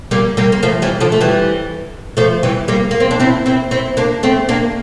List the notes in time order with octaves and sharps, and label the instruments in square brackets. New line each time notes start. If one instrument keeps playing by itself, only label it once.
[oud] G3 A#3
G3 A#3
A#3
F3 A3
E3 G3
D3 F3
A3
E3 G3
F3 A3
E3 G3
G3 A#3
A#3
C4
D4
C4 E4
C4 E4
C4 E4
A#3 D4
A3 C4
A#3 D4